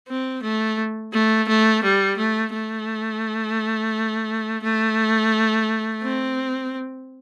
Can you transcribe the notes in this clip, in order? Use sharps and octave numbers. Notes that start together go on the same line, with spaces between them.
C4
A3
A3
A3
G3
A3
A3
A3
C4